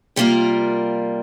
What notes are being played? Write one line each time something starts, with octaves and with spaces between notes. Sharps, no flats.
C3 G3 A#3 F4 A#4